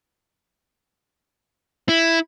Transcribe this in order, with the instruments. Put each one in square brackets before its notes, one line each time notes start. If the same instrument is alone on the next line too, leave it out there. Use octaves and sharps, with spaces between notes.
[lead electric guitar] E4